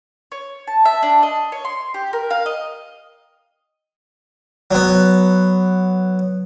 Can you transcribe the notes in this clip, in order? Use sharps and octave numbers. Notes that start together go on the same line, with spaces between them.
C#5
A5
E5
D4
D#5
C#5
C6
G4
A#4
F5
D#5
F#3 B3